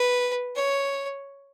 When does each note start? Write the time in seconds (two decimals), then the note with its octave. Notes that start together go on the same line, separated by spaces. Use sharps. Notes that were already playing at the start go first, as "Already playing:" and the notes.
Already playing: B4
0.55 C#5